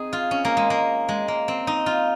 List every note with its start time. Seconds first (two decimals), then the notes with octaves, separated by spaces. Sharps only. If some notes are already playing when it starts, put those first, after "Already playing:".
Already playing: C4 D#4 G#4
0.13 F4
0.31 C#4
0.45 A#3
0.57 G#3
0.70 A#3
1.09 G#3
1.28 A#3
1.48 C4
1.67 D#4
1.86 F4